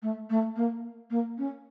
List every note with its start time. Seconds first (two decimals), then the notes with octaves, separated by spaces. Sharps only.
0.02 A3
0.29 A3
0.56 A#3
1.10 A#3
1.38 C#4